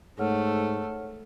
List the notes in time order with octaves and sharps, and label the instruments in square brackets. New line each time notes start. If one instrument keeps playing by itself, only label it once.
[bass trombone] G#2 [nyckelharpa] A3 [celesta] C#5 F#5 F6